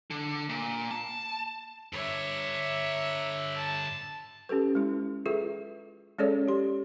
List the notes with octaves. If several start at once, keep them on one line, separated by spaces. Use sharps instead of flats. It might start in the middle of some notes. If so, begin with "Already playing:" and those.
D3
A#2
A5
G2 D3 C#5 E5
A5
C#4 G4 A4 B4
G#3 E4
F4 G#4 A4 B4 E5
G#3 C#4 G#4 A4 C#5 D5
G4 C6